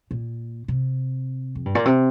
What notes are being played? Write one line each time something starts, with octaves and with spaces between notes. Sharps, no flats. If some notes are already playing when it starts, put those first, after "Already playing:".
A#2
C3
F2
G2
A#2
C3